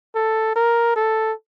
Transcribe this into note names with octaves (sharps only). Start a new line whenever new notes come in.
A4
A#4
A4